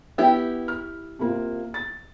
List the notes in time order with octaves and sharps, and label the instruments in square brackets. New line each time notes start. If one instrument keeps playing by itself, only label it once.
[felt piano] B3 [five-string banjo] E4 G4
[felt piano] F6
C3 A#3 F4
A6